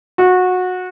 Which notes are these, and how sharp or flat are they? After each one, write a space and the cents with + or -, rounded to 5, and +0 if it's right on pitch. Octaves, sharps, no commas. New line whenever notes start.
F#4 -20